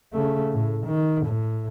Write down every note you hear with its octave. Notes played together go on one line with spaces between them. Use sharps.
C#3 A3
A2
D#3
A2